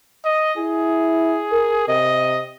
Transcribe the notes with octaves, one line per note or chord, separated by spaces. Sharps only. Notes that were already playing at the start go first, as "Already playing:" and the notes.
D#5
E4 G#4
A#4
C3 D#5